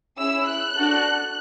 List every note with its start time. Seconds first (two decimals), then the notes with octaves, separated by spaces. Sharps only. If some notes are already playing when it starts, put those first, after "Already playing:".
0.19 C#4 E4 G#4 E6
0.47 F#6
0.75 D4 F#4 A4